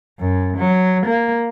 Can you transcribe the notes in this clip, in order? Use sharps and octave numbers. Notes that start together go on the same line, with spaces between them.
F#2
F#3
A#3